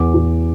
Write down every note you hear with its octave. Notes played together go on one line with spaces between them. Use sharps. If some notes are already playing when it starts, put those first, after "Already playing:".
Already playing: E2 D6
E2